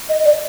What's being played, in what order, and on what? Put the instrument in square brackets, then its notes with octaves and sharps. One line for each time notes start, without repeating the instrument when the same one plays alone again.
[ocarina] D#5
D5